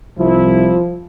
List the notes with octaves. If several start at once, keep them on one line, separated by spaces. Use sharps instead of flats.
C2 F3 E4